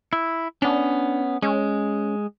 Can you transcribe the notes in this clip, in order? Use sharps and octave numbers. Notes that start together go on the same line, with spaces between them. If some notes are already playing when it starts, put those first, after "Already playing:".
E4
B3 C#4 D4
G#3 C#4